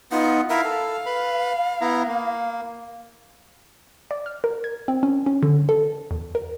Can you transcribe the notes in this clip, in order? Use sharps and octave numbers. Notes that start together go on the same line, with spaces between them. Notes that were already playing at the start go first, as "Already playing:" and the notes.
B3 D#4 F4 F#5
E4 A#4 E5 F5
A4
B4 B5
B3 E4 A#5
A#3
D5
F6
A#4
G#6
C4
C#4
C#4
D3
A4
E2
A#4